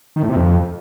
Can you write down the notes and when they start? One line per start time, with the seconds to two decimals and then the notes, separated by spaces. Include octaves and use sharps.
0.16 D#3
0.23 A2
0.29 C3
0.36 F2